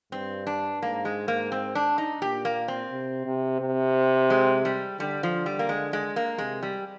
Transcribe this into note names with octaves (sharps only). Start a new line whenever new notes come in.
G2 C4
D4
G#2 A#3
G#3
A#3
C4
D4
D#4
A#2 G4
A#3
C4
C3
C3
C3
G#3
G3
D3 G3
F3
G3
A#3
G#3
G#3
A#3
C3 G#3
G3